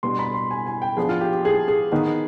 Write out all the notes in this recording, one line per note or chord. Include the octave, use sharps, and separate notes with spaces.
B2 G3 B3 D4 C6
B5
C6
G#5
G#5
G5
F3 B3 D4 G#4
F4
G4
G4
G#4
G#4
D#3 B3 D#4